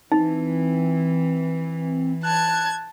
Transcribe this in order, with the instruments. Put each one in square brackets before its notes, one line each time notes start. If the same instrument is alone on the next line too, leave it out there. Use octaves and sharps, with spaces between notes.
[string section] E3 [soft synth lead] C4 [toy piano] D#4
[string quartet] A5 G#6 [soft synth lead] F#6